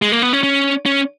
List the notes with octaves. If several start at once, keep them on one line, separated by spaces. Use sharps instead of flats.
G#3
A#3
B3
C#4
C#4
C#4